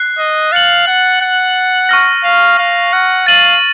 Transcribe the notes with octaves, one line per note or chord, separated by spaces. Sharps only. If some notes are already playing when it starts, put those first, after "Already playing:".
Already playing: F#6 C7
D#5
F5 A6 C#7 F#7
F#5
F#5
C#6 F6 A#6
F5
F5
F#5
F5 A6 D#7 F#7